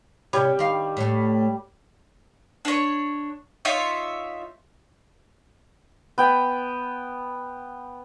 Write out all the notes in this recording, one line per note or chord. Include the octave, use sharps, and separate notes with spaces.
C3 G3 C#5
D#3 F5
A2 A3
D4 C#5
D#4 F4 C#5 E5
B3 G5